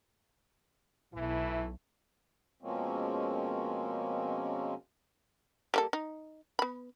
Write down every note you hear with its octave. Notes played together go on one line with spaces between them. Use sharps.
B1 E3 A3 E4
B2 F3 G#3 A#3 C4 C#4
G3 A#3 A4
D#4
B3 B5